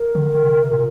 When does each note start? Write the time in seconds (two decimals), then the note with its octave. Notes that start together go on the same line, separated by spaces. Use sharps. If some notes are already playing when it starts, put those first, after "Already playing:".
Already playing: A#4
0.15 D3
0.44 C3
0.72 A#2